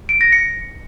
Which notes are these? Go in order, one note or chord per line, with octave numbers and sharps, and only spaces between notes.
D7
A#6
C#7